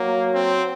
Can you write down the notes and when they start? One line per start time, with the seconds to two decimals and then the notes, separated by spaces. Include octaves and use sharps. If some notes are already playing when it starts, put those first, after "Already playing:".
Already playing: F#3 A#3
0.34 C4